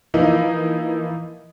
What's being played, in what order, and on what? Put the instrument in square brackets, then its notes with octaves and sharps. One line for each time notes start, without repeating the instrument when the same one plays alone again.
[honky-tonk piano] E3 F3 A#3 D#4 E4 D#5